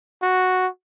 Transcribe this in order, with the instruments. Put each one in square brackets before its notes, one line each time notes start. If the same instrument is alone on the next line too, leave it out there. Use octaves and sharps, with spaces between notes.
[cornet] F#4